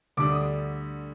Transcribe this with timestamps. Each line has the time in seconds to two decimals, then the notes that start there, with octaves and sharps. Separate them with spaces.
0.17 D2 D3 G3 D4 D6
0.32 D#6